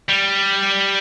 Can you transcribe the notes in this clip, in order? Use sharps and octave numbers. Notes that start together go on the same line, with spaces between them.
G3